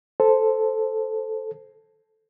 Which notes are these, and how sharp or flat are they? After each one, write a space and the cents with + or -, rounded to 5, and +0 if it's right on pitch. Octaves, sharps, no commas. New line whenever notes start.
A4 -5 C5 +0